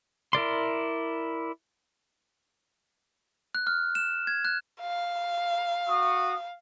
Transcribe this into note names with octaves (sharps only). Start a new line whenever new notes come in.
E4 A#4 D5 C6
F#6
F6
E7
G#6
F#6
F5
F#4 C#6 D#6